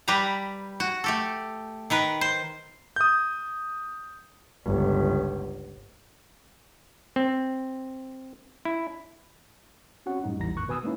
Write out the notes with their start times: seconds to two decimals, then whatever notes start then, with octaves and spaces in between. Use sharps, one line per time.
0.08 G3 G4 B4 A#5
0.80 F#4
1.04 A3 G4 A4
1.90 D#3 A#4 B4
2.21 C5
2.96 D#6 G6
4.64 G1 C#2
7.16 C4
8.65 E4
10.06 C4 C#4 F#4 F#5
10.24 F#2 A2 G3 D#4
10.39 A1 E2 G3 E4 A#5 A#6
10.55 F2 A2 D#3 C#6 F#6
10.68 B2 B4 G#5 D#6 E6
10.83 G#3 A#3 C#4 D#4 E4